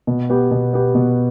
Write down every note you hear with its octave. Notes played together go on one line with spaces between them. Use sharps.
B2
B3 G4
B2
B3 G4
B2